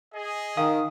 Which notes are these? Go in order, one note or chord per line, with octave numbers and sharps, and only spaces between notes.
G#4 D#5
D#3 F5 D#6